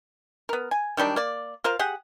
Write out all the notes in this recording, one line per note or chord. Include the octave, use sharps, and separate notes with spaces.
B3 A#4
G#5
D#3 F#3 G3 D4
A#3 D5
F4 A#4 C5 F5
G4 G#4 F#5